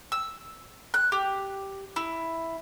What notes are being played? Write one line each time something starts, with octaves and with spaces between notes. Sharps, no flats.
E6
F#6
G4
E4